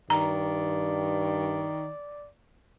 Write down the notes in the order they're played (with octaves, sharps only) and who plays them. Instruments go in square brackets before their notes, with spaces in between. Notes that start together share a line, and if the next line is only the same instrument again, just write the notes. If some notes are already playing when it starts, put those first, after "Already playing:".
[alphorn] G2 [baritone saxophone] D#3 [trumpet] D5 [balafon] A#5